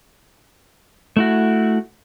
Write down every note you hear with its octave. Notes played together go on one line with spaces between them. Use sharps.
A3 E4 F#4